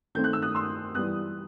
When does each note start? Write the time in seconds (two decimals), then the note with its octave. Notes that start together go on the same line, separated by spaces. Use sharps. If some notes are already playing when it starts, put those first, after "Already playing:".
0.15 D#3 A3 C4 G6
0.24 F#6
0.33 E6
0.42 D#6 F#6
0.55 C6 E6
0.95 E3 G3 B3 D#6 F#6